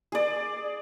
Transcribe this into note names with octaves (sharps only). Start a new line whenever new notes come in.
G#4 D5